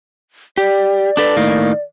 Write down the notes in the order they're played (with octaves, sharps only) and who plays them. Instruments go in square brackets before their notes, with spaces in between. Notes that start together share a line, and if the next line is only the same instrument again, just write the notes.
[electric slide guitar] G4 [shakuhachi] D5
[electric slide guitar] D4 A4 B4
A2 D#3 A#3